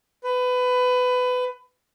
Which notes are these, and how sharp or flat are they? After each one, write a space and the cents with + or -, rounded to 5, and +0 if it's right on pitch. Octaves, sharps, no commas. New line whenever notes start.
B4 +20